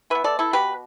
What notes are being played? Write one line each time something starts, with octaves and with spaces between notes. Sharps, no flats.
E3 B3 B4 E5
A4 D5
E4 A4
B2 B3 G4 B4